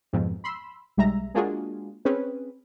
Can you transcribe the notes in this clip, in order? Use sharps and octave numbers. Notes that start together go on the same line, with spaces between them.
F2 G#2 B2 F3
B5 C6 E6
B1 G3 G#3 E5 A#5
G#3 A#3 D4 F4 F#4 G#4
C4 C#4 G#4 B4